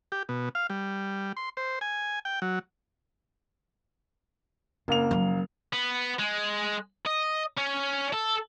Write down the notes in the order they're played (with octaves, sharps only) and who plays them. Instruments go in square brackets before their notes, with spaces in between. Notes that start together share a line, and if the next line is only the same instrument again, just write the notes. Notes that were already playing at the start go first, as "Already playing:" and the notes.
[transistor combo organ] G4
B2
F5
G3
C6
C5
G#5
G5
F#3
[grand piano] F#1 A#3 F7 [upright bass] C4
[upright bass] F3 F#3
[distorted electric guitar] B3
G#3
D#5
C#4
A4